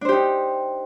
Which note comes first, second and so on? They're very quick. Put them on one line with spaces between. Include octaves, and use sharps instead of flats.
D4 C5 G4 D#4